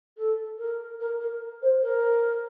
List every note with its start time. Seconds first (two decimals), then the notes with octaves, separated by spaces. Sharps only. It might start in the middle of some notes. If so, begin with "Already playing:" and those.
0.17 A4
0.58 A#4
1.00 A#4
1.20 A#4
1.62 C5
1.82 A#4